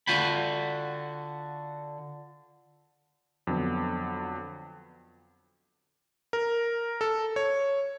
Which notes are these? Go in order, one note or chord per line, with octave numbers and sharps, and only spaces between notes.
D3 F4 F#4 G5 B5
F2 D3 F#3 B3
A#4
A4
C#5